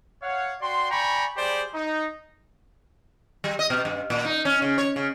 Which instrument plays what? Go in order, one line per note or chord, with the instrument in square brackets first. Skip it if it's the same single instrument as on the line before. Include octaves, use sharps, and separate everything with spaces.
[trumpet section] C#5 F5 F#5
F#4 D5 G5 C6
D5 G5 G#5 A#5 B5 C#6
G3 G4 G#4 C5 D5
D#4
[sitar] G3
D#5
B2
G2
A#2
D#4
C#4
C#3
C#5
C#3